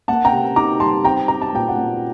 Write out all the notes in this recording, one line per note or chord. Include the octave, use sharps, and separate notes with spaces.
A#3 F#5 A5
G5 A#5
C3
D#4 A#5 D6
G3 A5 C6
C4 G5 A#5
C4 A#5
A5
A#2 G5
F#5 A5
A#2